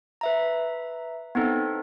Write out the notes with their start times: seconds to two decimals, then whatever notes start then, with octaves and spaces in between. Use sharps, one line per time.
0.21 B4 E5 A#5
1.35 B3 C4 D#4 A4